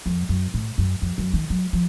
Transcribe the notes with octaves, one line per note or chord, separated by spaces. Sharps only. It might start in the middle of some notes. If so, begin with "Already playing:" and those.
F2
F#2
A2
F#2
F2
F#2
D#3
F#3
F3